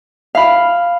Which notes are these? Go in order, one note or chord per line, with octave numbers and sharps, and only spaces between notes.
E5 F5 B5